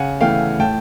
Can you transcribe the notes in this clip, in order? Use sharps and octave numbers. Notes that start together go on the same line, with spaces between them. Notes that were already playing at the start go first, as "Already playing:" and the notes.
Already playing: C#3 F#5 G#5
E3 A3 F5 G5
A2 G5 A5